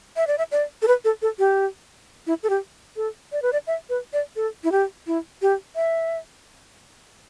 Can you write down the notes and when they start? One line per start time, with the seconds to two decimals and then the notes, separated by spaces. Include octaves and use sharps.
0.17 E5
0.27 D5
0.38 E5
0.52 D5
0.82 A4
0.88 B4
1.05 A4
1.22 A4
1.39 G4
2.27 E4
2.43 A4
2.49 G4
2.96 A4
3.32 D5
3.42 B4
3.53 D5
3.67 E5
3.89 B4
4.13 D5
4.36 A4
4.64 E4
4.72 G4
5.07 E4
5.42 G4
5.76 E5